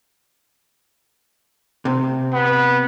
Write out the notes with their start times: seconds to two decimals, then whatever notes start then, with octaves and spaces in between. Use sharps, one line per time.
1.85 C3
2.33 B3